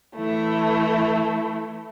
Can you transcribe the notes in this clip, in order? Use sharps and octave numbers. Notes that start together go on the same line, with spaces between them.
E3 A3 E4